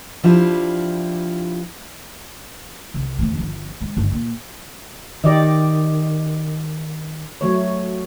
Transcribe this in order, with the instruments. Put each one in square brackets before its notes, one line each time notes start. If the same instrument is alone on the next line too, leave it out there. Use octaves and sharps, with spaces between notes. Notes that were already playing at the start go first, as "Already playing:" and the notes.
[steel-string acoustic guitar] F3 G3 D4 E4 F4
[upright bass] C2
E2 A2
G1 F3
G#3
G1
A#2
[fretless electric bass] D#3 [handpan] G4 D5 D#5
[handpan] F#3 A3 C#5